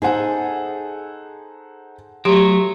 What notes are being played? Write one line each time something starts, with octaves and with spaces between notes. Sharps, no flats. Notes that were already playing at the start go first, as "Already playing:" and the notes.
D#4 G#4 A4 C5 F#5
F#3 A3 G4 C6